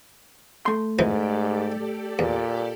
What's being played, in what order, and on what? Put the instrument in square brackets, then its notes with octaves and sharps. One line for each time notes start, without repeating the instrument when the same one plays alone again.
[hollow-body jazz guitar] A3 C6
[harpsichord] F2 E3 D#4 [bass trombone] G#2 [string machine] G4 A4 D5
[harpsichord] E2 [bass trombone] A#2